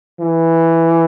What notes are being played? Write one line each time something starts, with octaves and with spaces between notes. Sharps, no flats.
E3